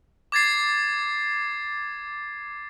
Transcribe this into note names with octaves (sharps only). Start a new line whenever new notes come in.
D6 G#6 A6 C7